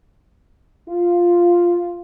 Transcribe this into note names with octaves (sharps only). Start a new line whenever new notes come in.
F4